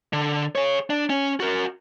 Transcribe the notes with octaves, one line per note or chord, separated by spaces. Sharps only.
D3
G#4 C#5
D4
C#4
F#4 A#4